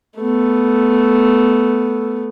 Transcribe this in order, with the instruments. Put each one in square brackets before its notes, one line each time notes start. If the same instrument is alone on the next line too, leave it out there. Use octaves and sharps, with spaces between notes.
[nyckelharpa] A3 B3